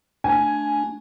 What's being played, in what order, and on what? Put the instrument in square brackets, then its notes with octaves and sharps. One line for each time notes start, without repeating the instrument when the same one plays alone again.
[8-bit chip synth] A3 D4 [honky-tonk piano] G#5